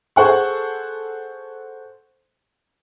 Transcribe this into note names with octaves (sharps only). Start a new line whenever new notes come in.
G#4 A4 C5 F#5 C#6